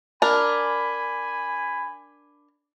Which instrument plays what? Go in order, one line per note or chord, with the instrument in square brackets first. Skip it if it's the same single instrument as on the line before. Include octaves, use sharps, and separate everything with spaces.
[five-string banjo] D4 A#4 [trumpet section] G#5 B5